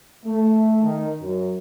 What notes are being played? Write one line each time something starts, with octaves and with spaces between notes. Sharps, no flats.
A3
D#3
F#2